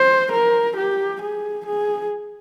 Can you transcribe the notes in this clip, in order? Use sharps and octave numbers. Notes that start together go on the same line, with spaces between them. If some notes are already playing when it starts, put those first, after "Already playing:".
Already playing: C5
A#4
G4
G#4
G#4